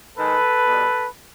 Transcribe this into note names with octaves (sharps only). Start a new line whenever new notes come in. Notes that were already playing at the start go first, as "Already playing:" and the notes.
G#2 D#3 G#3 A4 B4
B2 G3